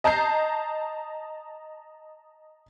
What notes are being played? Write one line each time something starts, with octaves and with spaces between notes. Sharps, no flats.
D#5 A5 A#5 G6 C7